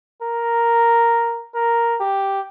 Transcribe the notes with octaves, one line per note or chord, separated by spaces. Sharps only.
A#4
A#4
G4